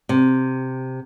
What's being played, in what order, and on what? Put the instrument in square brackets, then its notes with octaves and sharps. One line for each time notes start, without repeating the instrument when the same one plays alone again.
[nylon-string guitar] C3